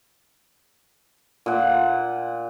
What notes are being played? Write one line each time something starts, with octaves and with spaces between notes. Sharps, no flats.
A#2 F#5